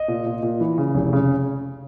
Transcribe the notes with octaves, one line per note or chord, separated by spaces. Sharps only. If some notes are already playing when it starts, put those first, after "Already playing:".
Already playing: D#5
A#2
A#2
A#2
E3
C#3
F1
C#3